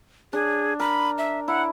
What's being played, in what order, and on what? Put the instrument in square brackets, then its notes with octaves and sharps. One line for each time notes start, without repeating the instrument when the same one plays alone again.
[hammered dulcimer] D4 [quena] G#4
[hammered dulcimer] A#4 [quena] B5
[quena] E5
[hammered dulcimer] E4 [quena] F#5